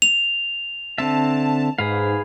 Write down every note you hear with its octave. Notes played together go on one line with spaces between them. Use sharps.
F7
D3 C4 E5 A5
G#2 G#4 B4 F5